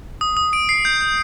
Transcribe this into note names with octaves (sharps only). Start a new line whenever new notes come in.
D#6
D#6
D7
C7
G6
G6